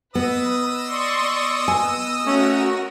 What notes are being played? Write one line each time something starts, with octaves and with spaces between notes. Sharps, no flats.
B3 B4 D#5 D#6 E6
D5 C6 C#6
B3 G#5
A3 C#4 F#4 A#4